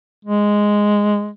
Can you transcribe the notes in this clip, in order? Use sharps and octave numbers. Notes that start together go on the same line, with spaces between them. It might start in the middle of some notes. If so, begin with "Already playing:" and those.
G#3